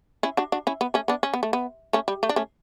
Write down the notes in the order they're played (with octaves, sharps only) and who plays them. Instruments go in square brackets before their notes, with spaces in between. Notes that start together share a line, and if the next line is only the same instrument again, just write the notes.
[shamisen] C#4 E4
D4 F#4
D4 F#4
C#4 E4
B3
A3 C#4
B3 D4
C#4
B3
A3
B3
A3 C#4
G3
A3
D4
A3 C#4